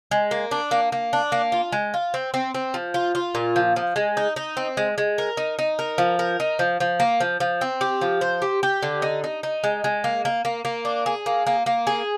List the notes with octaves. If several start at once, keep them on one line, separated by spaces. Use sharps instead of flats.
G#3
A#3
D4
A#3
A#3
D4
A#3
F4
G#3
F4
C4
C4
C4
F3
F4
F4
A#2
F3
F3
G#3
D#4
D#4
C4
G#3
G#3
A#4
D#4
D#4
A#4
F3
A#4
D#4
F3
F3
A#3
F3
F3
C4
G4
F3
C5
G4
G4
D3
D#4
D#4
D#4
G#3
G#3
A#3
A#3
A#3
A#3
D4
G#4
A#3
A#3
A#3
G#4